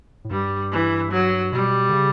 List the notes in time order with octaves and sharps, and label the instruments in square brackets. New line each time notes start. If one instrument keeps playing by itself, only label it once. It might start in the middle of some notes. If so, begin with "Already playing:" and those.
[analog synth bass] A2
[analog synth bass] G2 [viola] G3
[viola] E3
F#3
[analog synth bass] B2 [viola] G3
[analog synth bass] D3
C#3